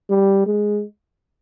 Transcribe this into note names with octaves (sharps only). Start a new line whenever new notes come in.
G3
G#3